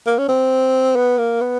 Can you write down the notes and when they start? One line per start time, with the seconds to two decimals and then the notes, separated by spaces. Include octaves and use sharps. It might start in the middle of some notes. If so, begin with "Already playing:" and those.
0.06 A#3
0.18 C#4
0.29 C4
0.96 B3
1.18 A#3
1.41 B3